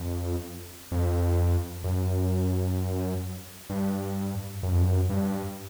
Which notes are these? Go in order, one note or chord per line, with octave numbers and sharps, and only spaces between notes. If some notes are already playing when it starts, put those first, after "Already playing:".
Already playing: F2
F2
F#2
G2
F#2
F2
F#2
G2